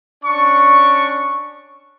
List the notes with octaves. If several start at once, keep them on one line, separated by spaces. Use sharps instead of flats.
C#4 D4 C#6